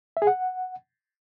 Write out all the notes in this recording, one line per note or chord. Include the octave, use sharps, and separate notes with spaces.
E5
G#4
F#5